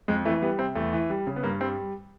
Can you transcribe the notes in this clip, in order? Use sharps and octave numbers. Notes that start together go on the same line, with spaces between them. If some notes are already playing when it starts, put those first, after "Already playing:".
F2 G#3
E3 A3
G3 B3
C3 C4
E2 A3
E3
G3
C#3
B3
G2 A#3
G3 C4